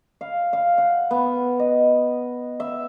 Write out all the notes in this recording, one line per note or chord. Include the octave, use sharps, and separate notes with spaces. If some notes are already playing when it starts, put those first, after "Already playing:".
F5
F5
F#5
B3
D#5
E5